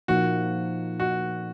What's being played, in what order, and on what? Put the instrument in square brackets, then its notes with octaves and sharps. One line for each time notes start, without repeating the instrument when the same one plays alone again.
[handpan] A#2 F3 A#3 D#4 [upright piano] F#4
[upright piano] F#4